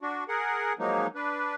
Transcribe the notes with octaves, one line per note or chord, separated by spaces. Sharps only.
D4 F#4
G#4 A#4 F#5
F3 F#3 G#3 A#3 D#4
D4 B4